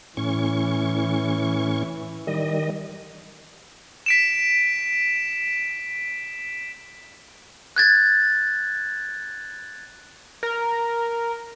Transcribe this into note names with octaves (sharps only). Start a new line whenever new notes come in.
A2 E3 C#4 C#6
D#3 G3 D#5
B6 D7 E7
F#6 G#6 A6
A#4